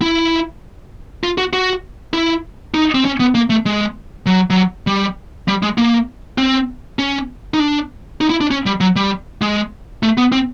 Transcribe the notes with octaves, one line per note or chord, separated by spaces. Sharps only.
E4
F4
F#4
F#4
E4
D#4
C4
C#4
B3
A#3
A3
G#3
F#3
F#3
G3
G3
G#3
A#3
C4
C#4
D#4
D4
D#4
E4
D4
C#4
G3
F#3
G3
G#3
A3
B3
C4